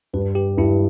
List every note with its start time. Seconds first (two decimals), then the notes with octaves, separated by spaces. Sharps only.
0.13 G2 B4
0.35 G4
0.57 G2 E4